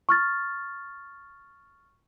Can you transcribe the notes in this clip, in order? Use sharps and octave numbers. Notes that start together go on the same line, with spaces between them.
C#6 F6 A6